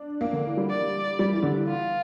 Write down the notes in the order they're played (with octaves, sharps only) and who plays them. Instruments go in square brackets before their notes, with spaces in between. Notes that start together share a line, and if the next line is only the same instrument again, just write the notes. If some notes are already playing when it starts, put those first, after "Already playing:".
Already playing: [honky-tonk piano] D4
A#3
D3
E3
G3
[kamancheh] D5
[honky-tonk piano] G3
E3
D3
E3
[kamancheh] F4